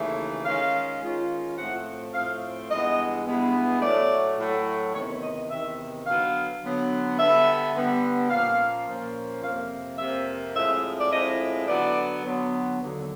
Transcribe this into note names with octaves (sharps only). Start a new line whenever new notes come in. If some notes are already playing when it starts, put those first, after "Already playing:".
Already playing: D#2 C#3 E3 A3
D#3 G#3 C#4 F4 F5
D#3 G#3 C#4 F4
A2 F3 A3 C4 F#5
A2 F3 A3 C4 F5
G2 E3 G#3 B3 D#5
G2 E3 G#3 B3
A2 F#3 A3 D5
A2 F#3 A3
E2 C3 D#3 C#5
C#5
D#5
D#5
E2 C3 D#3 E5
D3 F#3 B3 F5
D3 F#3 B3
D3 G3 B3 E5
D3 G3 B3
A#2 F3 A#3 C#4 F5
A#2 F3 A#3 C#4
F2 C3 F3 A#3 F5
F2 C3 F3 A#3 E5
A2 F3 G#3 C4 E4 E5
D5
A2 F3 G#3 C4 E4 D#5
D3 F#3 B3 D5
D3 F#3 B3
D#2 D3 F#3